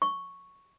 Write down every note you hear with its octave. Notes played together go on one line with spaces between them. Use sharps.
C#6